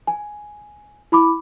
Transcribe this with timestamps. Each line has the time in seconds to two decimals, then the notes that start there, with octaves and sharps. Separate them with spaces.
0.07 G#5
1.12 E4 B5 D6